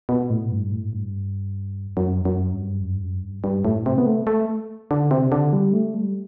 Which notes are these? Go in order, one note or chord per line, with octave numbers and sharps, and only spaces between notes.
B2
A2
G2
A2
G2
F#2
F#2
G2
F#2
G2
F#2
G2
G2
A2
C3
B3
A3
A3
D3
C3
D3
G3
A3
G3